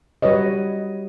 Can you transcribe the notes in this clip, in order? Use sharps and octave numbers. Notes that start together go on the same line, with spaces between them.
G3 F#4 B4 C#5 D#5